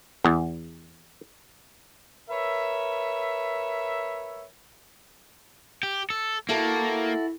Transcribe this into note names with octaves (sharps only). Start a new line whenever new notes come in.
E2
A#4 B4 C#5 E5
G4
A4
A#3 E4 F#4 A4